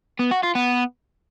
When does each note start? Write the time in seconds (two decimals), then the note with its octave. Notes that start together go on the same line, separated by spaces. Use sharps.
0.19 B3
0.31 F#4
0.43 F4
0.55 B3